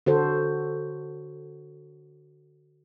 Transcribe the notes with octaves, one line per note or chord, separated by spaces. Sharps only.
D3 F#4 A4 C5